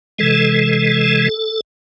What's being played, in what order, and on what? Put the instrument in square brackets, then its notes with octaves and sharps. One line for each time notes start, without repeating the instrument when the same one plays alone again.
[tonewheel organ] C3 E3 G#3 A4